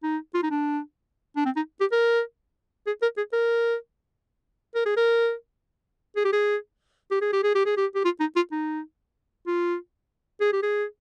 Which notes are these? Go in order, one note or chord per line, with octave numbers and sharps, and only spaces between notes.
D#4
F4
D#4
D4
D4
C4
D#4
G4
A#4
G#4
A#4
G#4
A#4
A#4
G#4
A#4
G#4
G4
G#4
G4
G#4
G4
G#4
G4
G#4
G4
G4
F4
D#4
F4
D#4
F4
G#4
G4
G#4